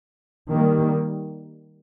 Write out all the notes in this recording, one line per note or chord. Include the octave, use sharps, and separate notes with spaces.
D#3 G3 A#3